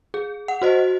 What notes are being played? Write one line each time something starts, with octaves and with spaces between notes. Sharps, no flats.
G#4
F#5
F#4 C5 D#5